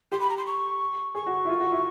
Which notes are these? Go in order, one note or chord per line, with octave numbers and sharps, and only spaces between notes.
G4 C6
B5
A#5
C6
C#6
G#4 C#6
F#4
E4
F4
F#4
E4